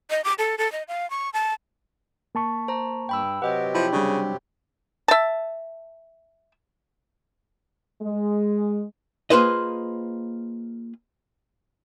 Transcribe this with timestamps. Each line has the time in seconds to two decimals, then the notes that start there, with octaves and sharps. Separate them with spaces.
0.10 D#5
0.24 D6
0.39 A4
0.58 A4
0.72 D#5
0.88 F5
1.10 C#6
1.34 A5
2.35 A#3 A5 C#6
2.68 C5 A#5
3.09 G2 G5 B5 E6
3.42 C3 F#3 G4 B4 D#5 F#5 G5
3.75 F3 E4 B5
3.93 C#3 G3 D4
5.08 E5 A5
8.02 G#3
9.30 A#3 F4 G#4 B4 C5 D#5